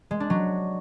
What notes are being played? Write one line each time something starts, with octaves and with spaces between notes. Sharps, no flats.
G#3
D4
F#3